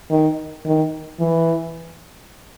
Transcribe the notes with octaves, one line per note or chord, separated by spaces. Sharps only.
D#3
D#3
E3